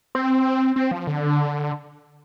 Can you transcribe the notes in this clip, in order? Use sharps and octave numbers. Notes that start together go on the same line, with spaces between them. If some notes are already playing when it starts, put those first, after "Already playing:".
C4
C4
F3
D3